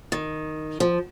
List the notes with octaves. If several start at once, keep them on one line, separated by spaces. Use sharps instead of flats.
D#3
F3